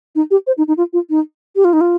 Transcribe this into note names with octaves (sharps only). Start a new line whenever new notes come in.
D#4
G4
C5
D#4
D#4
F4
F4
D#4
G4
F4
D#4
F4